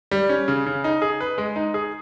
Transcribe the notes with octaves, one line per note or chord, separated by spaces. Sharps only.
G3
C#4
C#3
C#3
D#4
G#4
B4
G#3
D#4
G#4